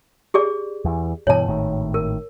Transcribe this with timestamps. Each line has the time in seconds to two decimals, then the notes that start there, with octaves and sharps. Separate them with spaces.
0.34 G4 G#4 D5
0.85 E2 E3
1.27 G2 B2 E3 C#5 A5
1.47 G#1 A2 D#3
1.94 A#4